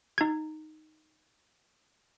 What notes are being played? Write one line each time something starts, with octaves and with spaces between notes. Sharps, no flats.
D#4 G#6